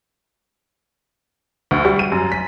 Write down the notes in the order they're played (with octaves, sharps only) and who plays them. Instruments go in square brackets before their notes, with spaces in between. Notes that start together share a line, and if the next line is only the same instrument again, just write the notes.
[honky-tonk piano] D2
G3
D#7
F#2
B6